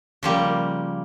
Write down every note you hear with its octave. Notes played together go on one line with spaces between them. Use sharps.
C#3 F3 G3 A#3